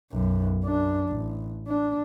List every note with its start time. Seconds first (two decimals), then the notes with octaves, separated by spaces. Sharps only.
0.12 B1 F#2
0.64 F#2 D4
1.09 A1
1.68 D4